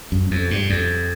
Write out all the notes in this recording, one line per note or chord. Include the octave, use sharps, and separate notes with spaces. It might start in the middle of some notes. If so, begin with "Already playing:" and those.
F#2
F2
G2
F2